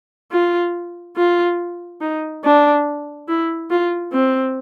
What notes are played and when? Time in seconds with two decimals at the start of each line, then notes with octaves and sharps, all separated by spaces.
0.32 F4
1.17 F4
2.01 D#4
2.44 D4
3.28 E4
3.71 F4
4.13 C4